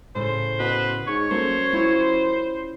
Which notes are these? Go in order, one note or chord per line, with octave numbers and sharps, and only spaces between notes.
A2 C#3 A3 C5
B2 B4
G#2 C#5 C#6
F#2 A3 A#3 A#4 C5
C#4 E4 F4